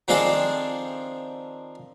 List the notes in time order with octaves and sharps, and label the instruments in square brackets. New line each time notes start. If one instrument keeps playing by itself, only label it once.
[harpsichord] D#3 F3 C4 D4 G#4 A4